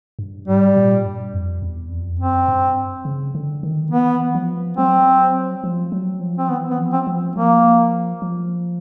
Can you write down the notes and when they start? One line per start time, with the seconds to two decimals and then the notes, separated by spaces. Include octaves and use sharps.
0.19 G2
0.47 G#2 G3
0.77 A#2
1.05 G2
1.33 F2
1.62 E2
1.91 F2
2.19 F#2 C4
2.48 G2
3.05 C#3
3.35 D3
3.63 D#3
3.91 E3 B3
4.35 F3
4.77 F#3 C4
5.64 F3
5.92 F#3
6.21 F3
6.38 C4
6.49 E3 B3
6.71 B3
6.78 F3
6.93 C4
7.07 F3
7.35 F3 A#3
8.22 F3